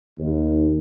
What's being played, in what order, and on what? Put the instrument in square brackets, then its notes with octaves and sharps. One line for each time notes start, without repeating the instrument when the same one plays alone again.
[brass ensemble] D#2